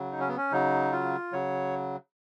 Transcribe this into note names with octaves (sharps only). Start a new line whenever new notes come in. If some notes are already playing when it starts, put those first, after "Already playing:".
Already playing: C#3 F#3
D#4
C#4
B3
C#4
C#3 F#3 D#4
F4
C#3 F#3 C#5